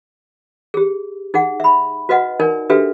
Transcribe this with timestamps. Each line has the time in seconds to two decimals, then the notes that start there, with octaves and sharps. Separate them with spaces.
0.74 G4 G#4
1.34 D#4 G#4 F#5
1.60 E5 B5
2.09 F#4 B4 D#5 F#5
2.40 D#4 A#4 D5 G#5
2.70 D4 F#4 G4 A4 B4 E5